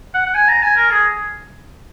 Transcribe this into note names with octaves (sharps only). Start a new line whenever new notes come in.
F#5
F#5
G#5
A#5
G#5
A#4
G#4